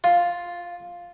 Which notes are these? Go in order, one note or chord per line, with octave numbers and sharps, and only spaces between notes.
F4